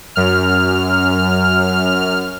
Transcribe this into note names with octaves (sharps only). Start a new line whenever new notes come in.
F#2 F6